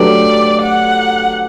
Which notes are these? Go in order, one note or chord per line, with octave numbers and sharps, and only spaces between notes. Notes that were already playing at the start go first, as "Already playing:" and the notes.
Already playing: F#3 A3 D4 G4 B4 D5
F#5